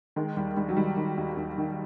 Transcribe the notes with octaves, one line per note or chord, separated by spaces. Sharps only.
D#3 G#3
D#2 G3
D#2 G3
F#3
D#3 G3
D#3
D#2
D#2
D#3